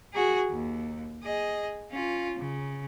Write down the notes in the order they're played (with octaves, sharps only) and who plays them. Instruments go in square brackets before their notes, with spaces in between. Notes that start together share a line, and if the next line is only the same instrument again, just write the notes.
[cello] F#4 G#4
D#2
G#4 D#5
C#4 F4
C#3